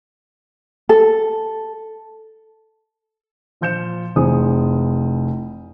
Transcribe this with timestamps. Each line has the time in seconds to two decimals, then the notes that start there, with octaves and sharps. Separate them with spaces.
0.89 A4
3.61 A#2 F3 F4 G6 C#7 E7
4.16 F1 E3 C4 G#4 D#6